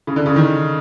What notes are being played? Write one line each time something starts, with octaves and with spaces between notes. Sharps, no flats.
C#3
D3
C#3
D#3